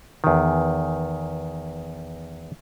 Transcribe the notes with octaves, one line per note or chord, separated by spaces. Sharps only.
E2 D#3